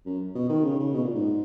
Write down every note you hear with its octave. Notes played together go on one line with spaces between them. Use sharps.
F#2
B2
D#3
C#3
C#3
B2
A#2
G#2